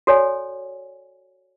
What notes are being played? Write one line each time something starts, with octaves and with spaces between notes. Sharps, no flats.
F#4 A4 C#5 D5 G#5